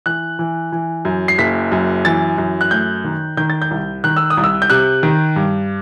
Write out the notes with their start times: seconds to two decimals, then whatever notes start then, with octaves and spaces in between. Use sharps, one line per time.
0.06 E3 F#6
0.39 E3
0.72 E3
1.05 F#2
1.28 C7
1.38 F#1 B6
1.72 F#2
2.05 E3 A6
2.38 F#2
2.61 F#6
2.71 A3 G6
3.04 D#3
3.37 D#3 G6
3.50 A6
3.62 G6
3.71 C2
4.04 D#3 F#6
4.17 E6
4.30 D#6
4.37 C2
4.44 E6
4.62 G6
4.70 C3 F#6
5.03 D#3
5.36 G2